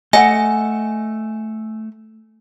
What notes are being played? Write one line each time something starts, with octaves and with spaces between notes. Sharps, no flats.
A3 D#5 F#5 G#5